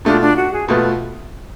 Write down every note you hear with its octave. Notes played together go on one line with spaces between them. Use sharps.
B2 A3 D4 F4
D4
F#4
G#4
B2 A3 F4 B4